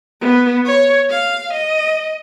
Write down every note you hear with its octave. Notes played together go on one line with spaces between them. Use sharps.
B3
C#5
F5
D#5